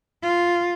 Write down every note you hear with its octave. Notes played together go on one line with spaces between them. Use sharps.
F4